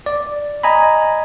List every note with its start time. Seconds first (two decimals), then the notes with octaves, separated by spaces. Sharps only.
0.06 D5
0.63 D#5 G#5 A#5 B5